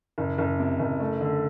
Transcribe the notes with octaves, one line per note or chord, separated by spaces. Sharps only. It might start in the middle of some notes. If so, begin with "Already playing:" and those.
F#1
F#1
C3
F#1
A3
D3